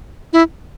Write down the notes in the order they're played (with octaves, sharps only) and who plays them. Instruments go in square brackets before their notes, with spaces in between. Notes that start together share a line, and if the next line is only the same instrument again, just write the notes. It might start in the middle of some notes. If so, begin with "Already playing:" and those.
[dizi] E4